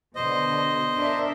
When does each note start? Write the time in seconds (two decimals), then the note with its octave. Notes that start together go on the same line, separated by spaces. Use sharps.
0.15 B2 D3 C5 D#5
0.98 D4 A#4 E5